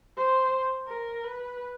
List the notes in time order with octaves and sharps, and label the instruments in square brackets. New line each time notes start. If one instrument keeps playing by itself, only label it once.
[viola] C5
A#4
B4